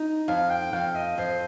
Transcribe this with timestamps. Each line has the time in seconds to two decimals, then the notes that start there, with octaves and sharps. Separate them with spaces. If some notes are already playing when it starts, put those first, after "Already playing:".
Already playing: D#4
0.28 F2 F5
0.50 G5
0.73 F2 F5
0.95 D#5
1.18 F2 C5